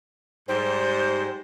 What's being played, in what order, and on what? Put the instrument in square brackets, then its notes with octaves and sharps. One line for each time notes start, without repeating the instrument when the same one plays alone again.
[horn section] G#2 G3 [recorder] C5